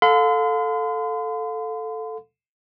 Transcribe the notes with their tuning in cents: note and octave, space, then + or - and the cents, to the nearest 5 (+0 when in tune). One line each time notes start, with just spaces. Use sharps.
A4 +0 F5 +30 C6 -45